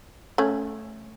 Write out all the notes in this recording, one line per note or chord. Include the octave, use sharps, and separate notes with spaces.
A3 C#4